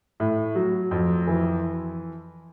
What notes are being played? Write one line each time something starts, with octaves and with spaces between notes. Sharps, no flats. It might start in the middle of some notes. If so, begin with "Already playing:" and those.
A2
F#3
F2
E3